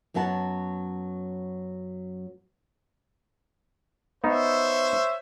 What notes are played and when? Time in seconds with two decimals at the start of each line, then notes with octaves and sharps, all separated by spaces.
0.14 F#2 F#3 B3 F#5 A5
4.24 B3 D#4 C5 C#5 E5